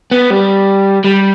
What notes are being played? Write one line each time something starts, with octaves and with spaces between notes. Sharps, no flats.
B3
G3
G3